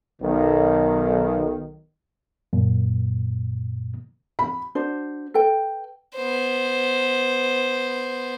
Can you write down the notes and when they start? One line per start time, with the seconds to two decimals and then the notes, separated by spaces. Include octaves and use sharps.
0.21 B1 D#3
2.53 F#2 A#2
4.39 B5
4.75 D4 F#4 C5
5.34 A4 B4 G5
6.16 B3 C5